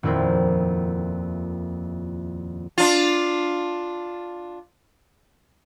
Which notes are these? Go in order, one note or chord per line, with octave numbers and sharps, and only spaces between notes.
D#1 F2 E4 A#4 C5
D4 F4